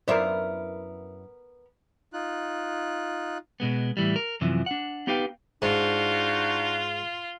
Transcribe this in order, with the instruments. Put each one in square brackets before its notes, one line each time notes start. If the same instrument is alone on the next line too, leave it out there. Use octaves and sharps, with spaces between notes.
[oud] F#2 E4 E5 [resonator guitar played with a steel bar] B3 A#4 [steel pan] C5 D5 C6
[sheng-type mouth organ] D#4 F4 F#6
[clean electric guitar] B2 G#3 B3
A2 E3 G3
A#4
F#2 C3 E3 F3
D4 F#5
B3 D#4 G4 B4 F5 G5
[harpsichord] G#2 [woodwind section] D4 D#4 F#4 [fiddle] F4